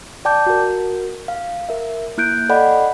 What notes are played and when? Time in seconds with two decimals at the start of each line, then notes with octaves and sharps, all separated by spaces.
0.25 D5 G5 A5 D6 G6
0.46 F#4 A#4
1.28 F5
1.69 A#4 E5
2.18 A#3 E4 F#6 G6 D7
2.49 A4 D5 D#5 F#5 G5 B5